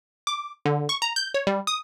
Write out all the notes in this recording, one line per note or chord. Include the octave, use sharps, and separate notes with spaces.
D6
D3
C#6
A#5
G6
C#5
G3
D#6